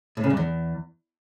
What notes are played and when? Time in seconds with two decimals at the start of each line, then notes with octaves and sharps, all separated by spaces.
0.17 A2
0.24 C#3
0.30 G2
0.37 E2